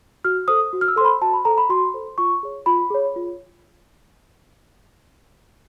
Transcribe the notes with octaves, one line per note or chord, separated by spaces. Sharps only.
F#4 F6
A4 C5 D#6
F#4
F6
E6
A4 C5 B5 C6
F#4 A5
B5
A4 C5 A#5
B5
F#4 C6
A4 C5
F4 C#6
G#4 C#5
F4 B5
G#4 C#5
F4